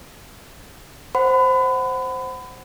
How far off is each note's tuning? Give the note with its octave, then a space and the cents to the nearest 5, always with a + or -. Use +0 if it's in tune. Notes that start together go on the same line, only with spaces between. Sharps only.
C5 +0 F#5 +10 B5 +30